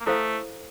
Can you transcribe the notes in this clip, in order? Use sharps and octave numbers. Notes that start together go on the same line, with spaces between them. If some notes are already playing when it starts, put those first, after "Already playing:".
A#3
A3 E4 A4 C5 F5